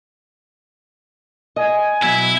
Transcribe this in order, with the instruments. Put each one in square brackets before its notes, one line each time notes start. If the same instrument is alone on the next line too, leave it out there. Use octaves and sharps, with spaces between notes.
[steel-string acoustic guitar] D#5 [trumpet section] G#5
[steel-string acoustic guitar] B2 F#3 [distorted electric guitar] E4